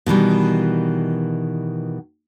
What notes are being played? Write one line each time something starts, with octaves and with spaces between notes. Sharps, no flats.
B2 D#3 E3 G3